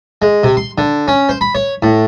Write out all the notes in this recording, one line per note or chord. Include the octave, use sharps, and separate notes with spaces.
G#3
C3
C6
D3
C#4
C5
B5
C#5
A2